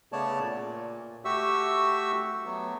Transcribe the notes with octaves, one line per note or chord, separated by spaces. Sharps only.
C#3 A3 B3 C#5 D5 A5
A#2
A3 F#4 G4 E5 C#6 E6
F#3 A3 B3